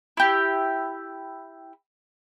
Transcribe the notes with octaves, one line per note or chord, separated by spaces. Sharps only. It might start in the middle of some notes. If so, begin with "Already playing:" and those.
E4 G4